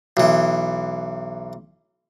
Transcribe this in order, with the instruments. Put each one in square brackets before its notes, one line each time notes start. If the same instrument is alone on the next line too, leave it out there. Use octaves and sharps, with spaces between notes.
[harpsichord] B1 E3